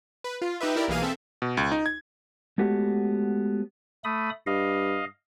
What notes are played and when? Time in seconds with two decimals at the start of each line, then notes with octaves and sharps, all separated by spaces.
0.24 B4
0.42 F4
0.60 D#4 G4 B4 E5
0.76 E4 G4 A#4 D5
0.88 B1 E3 A#3 G#4 F5 D#7
1.02 C4 A4 E5
1.42 B2
1.57 C#2
1.71 D#4
1.86 G#6
2.58 G#3 A3 B3 F#4 G4 C#5
4.04 A3 B5 D#6
4.47 G2 D#5 F5